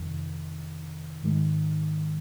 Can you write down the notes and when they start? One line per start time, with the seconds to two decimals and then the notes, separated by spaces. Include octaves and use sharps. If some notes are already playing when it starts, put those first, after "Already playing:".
Already playing: F2 C3 D#3
1.23 G#2 D#3 G#3